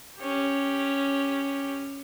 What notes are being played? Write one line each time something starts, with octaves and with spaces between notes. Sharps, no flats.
C#4 G4